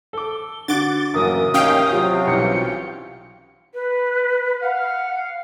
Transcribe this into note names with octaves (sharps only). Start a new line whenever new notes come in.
A4 D6 G7
D3 F#4 D6 F#6 A6
A1 F#2 C#3 A#3 D#6
D#2 D#3 C#4 F5 G5 D#6
C3 F#3 F4
B1 E3 G3 C#7
B4
F5 F#5